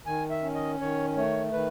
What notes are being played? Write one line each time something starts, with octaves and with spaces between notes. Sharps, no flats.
D#3 G#5
E5
C#4
D#5
D#3 C#5
A3 C#5
D#3 B4